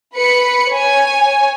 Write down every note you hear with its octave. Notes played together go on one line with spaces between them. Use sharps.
B4 B5 C#7
C#5 G#5